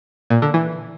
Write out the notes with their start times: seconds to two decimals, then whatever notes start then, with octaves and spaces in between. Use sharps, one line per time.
0.30 A#2
0.42 D3
0.54 E3